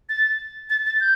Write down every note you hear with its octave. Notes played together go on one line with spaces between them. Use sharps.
A6
A6
A6
G6